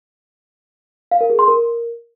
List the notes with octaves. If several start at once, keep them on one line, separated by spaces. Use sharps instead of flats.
F5
A#4
G#4
C6
A#4